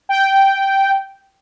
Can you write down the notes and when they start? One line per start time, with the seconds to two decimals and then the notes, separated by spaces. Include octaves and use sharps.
0.09 G5